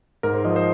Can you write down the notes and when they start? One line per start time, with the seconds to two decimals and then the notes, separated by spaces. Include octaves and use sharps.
0.23 G#2 A#4
0.35 C5
0.45 F3 D#5
0.56 C5